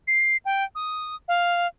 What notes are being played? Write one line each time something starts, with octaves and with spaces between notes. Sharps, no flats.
C7
G5
D#6
F5